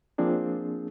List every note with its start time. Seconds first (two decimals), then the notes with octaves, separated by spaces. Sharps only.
0.18 F3 A#3 C4 D4 G#4